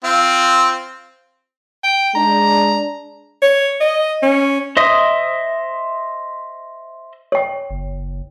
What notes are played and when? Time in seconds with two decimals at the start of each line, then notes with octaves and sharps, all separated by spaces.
0.04 C4 F4
1.84 G5
2.15 G#3 D4 A#5
3.42 C#5
3.81 D#5
4.22 C#4
4.77 C5 D#5 E5 D#6
7.32 C#5 G5
7.70 F#1